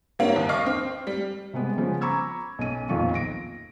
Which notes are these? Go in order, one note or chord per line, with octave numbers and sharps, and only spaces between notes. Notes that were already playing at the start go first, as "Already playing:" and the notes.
G3 A#3 C4 C#4 E4
D#2
D#5 F5 C#6 D6 F6 C7
C4
G3
C3 G3 G#3 B3
C#3 F3 B3 C#4
A#5 B5 C#6 D6 E6 G#6
B1 C#4 D#7
D#1 B1 F2 D#3 F4 C#6
A#6 D7